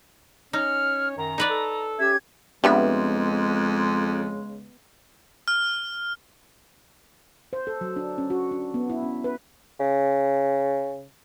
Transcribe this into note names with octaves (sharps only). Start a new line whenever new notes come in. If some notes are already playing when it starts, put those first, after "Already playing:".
C#4 D#4 C#5 F6
F#2 D#3 A#5
D#4 B4 D5
A4
C#4 G4 E5 G#6
F2 C#3 G3 G#3 B3 D4 E5
F6
C5
A4
F#3
D4
C#4
F#4
D4
B3
E4
C#4
B4
C#3